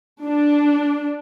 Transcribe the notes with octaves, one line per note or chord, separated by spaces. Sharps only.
D4